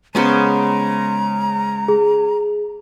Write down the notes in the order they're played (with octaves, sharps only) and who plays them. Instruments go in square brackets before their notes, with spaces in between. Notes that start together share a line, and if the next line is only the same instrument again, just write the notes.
[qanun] C#3 B3 C#4 [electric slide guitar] G#3 C5 [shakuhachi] A#5
[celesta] G#4